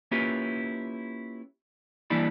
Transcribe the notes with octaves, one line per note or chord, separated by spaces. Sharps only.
A#3 C#4 E4 F4 G4 B4
E3 G3 A#3 D4 E4 B5